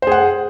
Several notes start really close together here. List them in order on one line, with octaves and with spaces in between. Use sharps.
C5 G#4 F#5